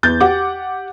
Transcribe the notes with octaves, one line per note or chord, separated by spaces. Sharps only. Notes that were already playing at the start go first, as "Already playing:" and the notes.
E2 G6 A6
G4 F#5 D6